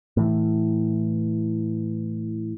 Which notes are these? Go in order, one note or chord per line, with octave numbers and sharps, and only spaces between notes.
A2 E3